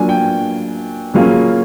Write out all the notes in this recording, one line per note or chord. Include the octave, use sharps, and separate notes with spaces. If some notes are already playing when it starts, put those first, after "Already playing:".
Already playing: F#3 A#3 D4 F4 G#5
G5
C#3 F#3 A#3 C#4 F4